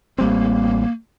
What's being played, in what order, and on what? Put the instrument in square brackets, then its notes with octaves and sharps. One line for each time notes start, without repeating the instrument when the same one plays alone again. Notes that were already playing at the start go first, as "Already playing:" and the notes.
[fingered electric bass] A1 G3 C4 [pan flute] A#3